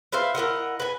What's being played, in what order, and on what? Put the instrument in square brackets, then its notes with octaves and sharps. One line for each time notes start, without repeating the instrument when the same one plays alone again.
[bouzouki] B4 C5 E5 F5
E4 A#4 D#5 F#5
B4 G#5